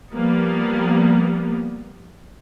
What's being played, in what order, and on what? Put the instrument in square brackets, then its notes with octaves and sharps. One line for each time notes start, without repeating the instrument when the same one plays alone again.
[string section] F3 G3 A#3 B3